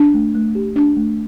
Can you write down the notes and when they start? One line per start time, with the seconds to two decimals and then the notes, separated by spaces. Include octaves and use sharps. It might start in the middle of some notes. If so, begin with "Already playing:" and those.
Already playing: D4
0.14 A3
0.35 A3
0.55 G4
0.76 D4
0.96 A3